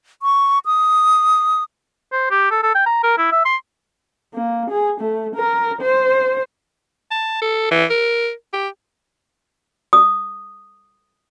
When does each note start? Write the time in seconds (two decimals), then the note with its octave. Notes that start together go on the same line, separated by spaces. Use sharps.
0.22 C#6
0.66 D#6
2.12 C5
2.31 G4
2.51 A4
2.63 A4
2.75 G5
2.86 A#5
3.03 A#4
3.18 E4
3.32 E5
3.45 C6
4.34 A#3
4.71 G#4
5.01 A3
5.36 A#4
5.81 C5
7.11 A5
7.42 A4
7.71 E3
7.90 A#4
8.53 G4
9.93 D#6